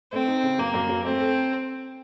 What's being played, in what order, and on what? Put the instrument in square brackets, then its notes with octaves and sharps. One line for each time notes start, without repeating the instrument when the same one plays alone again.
[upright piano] A3 [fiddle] C4
[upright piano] D#4
C#3
[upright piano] F#2 [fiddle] A#3
[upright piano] F#2
F#3
[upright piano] A3 [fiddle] C4
[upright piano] A4